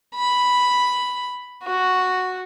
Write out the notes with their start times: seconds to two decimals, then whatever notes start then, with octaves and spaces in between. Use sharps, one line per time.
0.16 B5
1.64 F#4